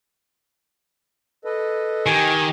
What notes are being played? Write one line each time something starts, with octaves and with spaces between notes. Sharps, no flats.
A4 B4 D#5
D#3 G4 G#5